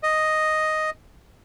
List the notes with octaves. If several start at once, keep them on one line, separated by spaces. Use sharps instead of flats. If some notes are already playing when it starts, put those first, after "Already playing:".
D#5